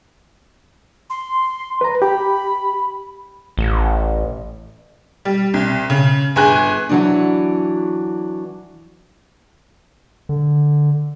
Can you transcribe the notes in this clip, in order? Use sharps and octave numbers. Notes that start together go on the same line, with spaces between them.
C6
B4 A#5
G4 B5
A1
G3
C2
C#3
G1 G#4 G#5 F#6
E3 F#3 D4
D3